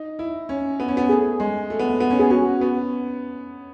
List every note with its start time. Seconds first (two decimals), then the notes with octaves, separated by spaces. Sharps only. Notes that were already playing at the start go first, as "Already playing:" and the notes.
Already playing: D#4
0.19 E4
0.49 C#4
0.80 B3
0.88 C#4
0.97 B3
1.09 A3 G#4
1.40 G#3
1.70 A3
1.79 B3
1.89 A3
2.00 B3
2.10 C#4
2.19 B3 G#4
2.30 C#4 F#4
2.61 B3